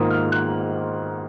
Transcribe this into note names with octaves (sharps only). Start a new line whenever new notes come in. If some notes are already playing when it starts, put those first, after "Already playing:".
Already playing: G#2 D#3 A#3 F4 D#6
F6
F#6